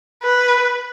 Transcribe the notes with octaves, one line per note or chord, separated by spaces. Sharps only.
B4